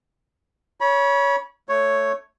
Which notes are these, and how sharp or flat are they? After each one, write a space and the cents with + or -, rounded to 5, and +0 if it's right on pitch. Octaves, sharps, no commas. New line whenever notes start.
C#5 +15 B5 -30
A3 +0 C#5 +0